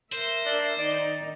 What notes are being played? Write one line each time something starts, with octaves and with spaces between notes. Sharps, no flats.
A#4 C5 E5
D4
D#3 D#4 D5